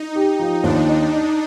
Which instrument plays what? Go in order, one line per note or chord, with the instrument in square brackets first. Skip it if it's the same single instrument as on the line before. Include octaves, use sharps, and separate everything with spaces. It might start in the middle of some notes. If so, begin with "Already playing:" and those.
Already playing: [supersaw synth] D#4
[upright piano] G4
F3
[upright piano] D#2 [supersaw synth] D4
[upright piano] D#4
D#4